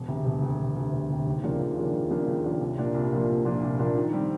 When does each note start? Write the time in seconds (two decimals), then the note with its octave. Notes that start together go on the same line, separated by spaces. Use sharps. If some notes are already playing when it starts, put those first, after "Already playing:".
Already playing: E1
0.08 D2 C3
0.25 E1
0.42 D2 C3
0.59 E1
0.76 D2 C3
0.92 E1
1.09 D2 C3
1.27 D#2
1.43 C#3 F3 A#3 D4
1.61 D#2
1.77 C#3 F3 A#3 D4
1.93 D#2
2.10 C#3 F3 A#3 D4
2.28 D#2
2.44 C#3 F3 A#3 D4
2.61 C2
2.78 A#2 F3 A#3 D4
2.94 C2
3.12 A#2 F3 A#3 D4
3.28 C2
3.45 A#2 F3 A#3 D4
3.63 C2
3.79 A#2 F3 A#3 D4
3.96 D#3
4.13 G3 C4